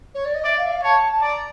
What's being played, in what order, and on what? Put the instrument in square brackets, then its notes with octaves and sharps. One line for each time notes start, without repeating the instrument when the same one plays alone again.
[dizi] C#5
D5
D#5
[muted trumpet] D5 [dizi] E5
[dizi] F5
E5
F5
[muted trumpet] C#5 [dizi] A5
[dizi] A5
[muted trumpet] D5 [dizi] A#5